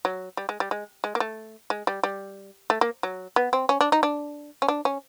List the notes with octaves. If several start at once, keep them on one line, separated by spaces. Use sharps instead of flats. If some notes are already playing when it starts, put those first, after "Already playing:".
F#3
G3
G#3
G3
G#3
G#3
A#3
A3
G#3
G3
G3
A3
A#3
F#3
B3
C4
C#4
D4
D#4
D4
C#4
D4
C#4